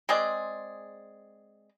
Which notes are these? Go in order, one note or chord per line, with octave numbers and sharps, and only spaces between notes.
G#3 C4 G#4 D5